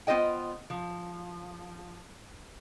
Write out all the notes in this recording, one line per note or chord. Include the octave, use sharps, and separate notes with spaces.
B3 F4 C5 D#5 G5
F3